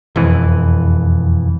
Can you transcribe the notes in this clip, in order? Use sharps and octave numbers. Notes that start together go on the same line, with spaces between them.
E1 F2 E3